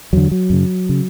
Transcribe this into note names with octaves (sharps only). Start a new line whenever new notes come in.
E2 D3 F#3
F#3
F#2 C#3
C#3